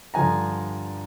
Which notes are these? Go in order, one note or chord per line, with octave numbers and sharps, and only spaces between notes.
G2 D3 F3 G#5 A#5